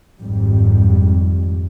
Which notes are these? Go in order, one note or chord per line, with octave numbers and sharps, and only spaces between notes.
G#1 F2 G#2 G3